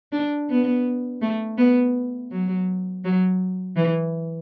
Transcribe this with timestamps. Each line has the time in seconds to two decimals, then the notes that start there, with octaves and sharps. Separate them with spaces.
0.12 D4
0.50 B3
1.21 A3
1.58 B3
2.32 F#3
3.05 F#3
3.76 E3